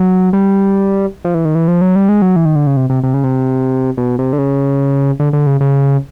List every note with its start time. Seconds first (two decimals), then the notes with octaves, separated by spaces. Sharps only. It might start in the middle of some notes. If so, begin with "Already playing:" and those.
Already playing: F#3
0.33 G3
1.25 F3
1.34 E3
1.45 D#3
1.55 E3
1.68 F3
1.81 F#3
1.96 G3
2.09 G#3
2.22 F#3
2.36 E3
2.45 D#3
2.55 D3
2.67 C#3
2.77 C3
2.90 C3
3.03 C3
3.14 C#3
3.24 C3
3.97 B2
4.19 C3
4.33 D3
4.38 C#3
5.20 D3
5.33 D3
5.47 C#3
5.61 C#3